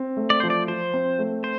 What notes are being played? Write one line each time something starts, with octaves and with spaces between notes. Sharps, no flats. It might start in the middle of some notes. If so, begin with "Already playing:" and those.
Already playing: C4
A3
D5
F3 C5
D5
F3 C5
C4
A3
C5